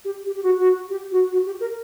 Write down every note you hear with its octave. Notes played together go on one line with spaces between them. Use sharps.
G4
G4
G4
F#4
F#4
G4
F#4
F#4
G4
A#4